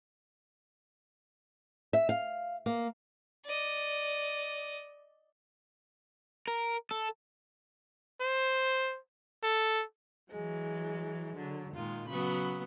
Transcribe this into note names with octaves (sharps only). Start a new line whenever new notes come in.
E5
F5
A#3
D5 D#5
A#4
A4
C5
A4
E3 F#3 G#3
D3 F#3
A#2 D#3 G#3 F4
C#3 F#3 B3 B5